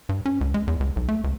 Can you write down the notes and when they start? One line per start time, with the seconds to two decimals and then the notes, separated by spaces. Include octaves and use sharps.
0.09 G2
0.26 C#4
0.41 C#2
0.54 G#3
0.67 E2
0.80 C#2
0.96 B1
1.09 A3
1.24 C#2